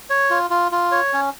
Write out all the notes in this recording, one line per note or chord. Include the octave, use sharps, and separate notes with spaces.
C#5
F4
F4
F4
C#5
C#4